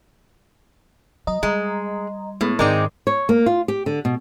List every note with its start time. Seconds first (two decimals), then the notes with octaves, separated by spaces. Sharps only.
1.27 F#3 D#5 A#5
1.43 G3 G#3
2.41 A2 G#3 A3 B3
2.59 G#2 D#3 G#3 C4 D#4 A#4 D5 D6
3.07 C#5
3.29 A#3
3.46 F4
3.68 G4
3.86 D3
4.05 B2